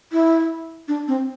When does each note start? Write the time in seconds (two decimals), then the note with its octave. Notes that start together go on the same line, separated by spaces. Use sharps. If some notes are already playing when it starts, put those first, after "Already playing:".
0.13 E4
0.88 D4
1.08 C4